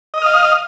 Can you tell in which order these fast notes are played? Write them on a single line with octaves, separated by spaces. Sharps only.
D#5 D#6 F6 F5